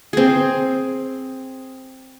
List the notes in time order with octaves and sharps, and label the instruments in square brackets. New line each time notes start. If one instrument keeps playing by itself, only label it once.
[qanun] C4 G#4